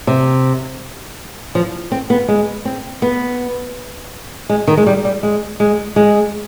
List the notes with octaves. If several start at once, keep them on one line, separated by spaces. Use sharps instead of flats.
C3
F3
C4
B3
G#3
C4
B3
G#3
D#3
G#3
G3
G3
G#3
G#3
G#3